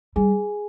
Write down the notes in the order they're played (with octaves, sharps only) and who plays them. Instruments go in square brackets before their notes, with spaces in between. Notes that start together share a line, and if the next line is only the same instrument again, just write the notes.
[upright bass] G3 [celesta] G#4 G#5